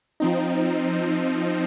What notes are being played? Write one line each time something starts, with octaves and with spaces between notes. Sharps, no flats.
F3 C4 D#4